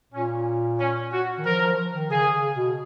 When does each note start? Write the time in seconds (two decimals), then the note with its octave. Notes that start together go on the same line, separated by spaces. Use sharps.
0.12 A#2 C#4
0.79 C#4
1.12 F#4
1.38 D#3
1.44 F3 A#4
1.61 F3
1.94 D#3
2.10 C#3 G#4
2.32 C#3
2.55 B2